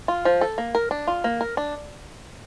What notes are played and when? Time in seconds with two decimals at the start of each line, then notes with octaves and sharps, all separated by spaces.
0.08 F4
0.25 F3
0.41 A4
0.58 A#3
0.75 A#4
0.91 D4
1.07 F4
1.24 A#3
1.41 A#4
1.57 D4